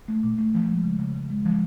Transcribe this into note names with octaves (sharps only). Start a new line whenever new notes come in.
A3
A#2
A3
F3
G#3
C#3
C#3
C#3
G#3
F3